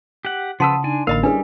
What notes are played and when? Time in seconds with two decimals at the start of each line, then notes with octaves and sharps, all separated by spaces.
0.25 G4 F#5
0.60 C#3 F3 B4 F#5 A5 C6 D#6 E6
0.84 D4 D#4 G#5
1.07 A1 D3 A#3 A#4 D#5 F5 B5
1.23 G3 C#4 D4 E4 G#4 B4